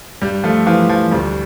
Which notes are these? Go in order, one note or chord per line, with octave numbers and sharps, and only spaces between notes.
G2 G3
F3 A3
E3 F3
F3
D2 G3